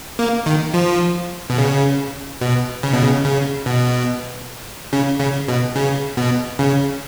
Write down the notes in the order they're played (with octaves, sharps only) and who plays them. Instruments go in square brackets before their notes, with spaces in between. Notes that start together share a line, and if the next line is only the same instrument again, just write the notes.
[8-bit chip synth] A#3
D#3
F3
B2
C#3
B2
C#3
B2
C#3
C#3
B2
C#3
C#3
B2
C#3
B2
C#3